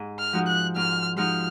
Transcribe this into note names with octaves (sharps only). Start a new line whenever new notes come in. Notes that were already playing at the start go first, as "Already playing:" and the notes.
Already playing: G#2
F6
F3 G#3 D#4 F#4
F#6
G#2 F6
F3 G#3 D#4 F#4 F6